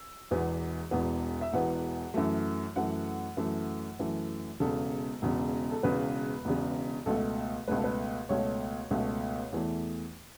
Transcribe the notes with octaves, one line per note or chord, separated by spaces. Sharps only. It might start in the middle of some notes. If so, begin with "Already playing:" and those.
Already playing: E6
E1 E2 E3 B3
E1 E2 E3 B3
E5
E1 E2 E3 B3 F#5
F#2 E3 A3
F#2 E3 A3 F#5
F#2 E3 A3
F#2 E3 A3
E1 E2 C#3 A4
E1 E2 C#3
A4
E1 E2 C#3 B4
E1 E2 C#3
C#2 B2 A3 A4
C#2 B2 A3 B4
A4
B4
C#2 B2 A3 C#5
C#2 B2 A3
E2 E3 A3